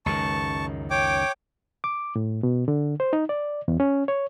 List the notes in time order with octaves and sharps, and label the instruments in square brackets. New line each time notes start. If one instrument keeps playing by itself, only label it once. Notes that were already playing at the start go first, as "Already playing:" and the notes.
[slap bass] C#2 F#2 D#3 [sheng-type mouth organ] A5 C#6
[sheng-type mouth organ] C#5 G5 D6
[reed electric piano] D6
A2
B2
D3
C5
D#4
D5
E2
C#4
C#5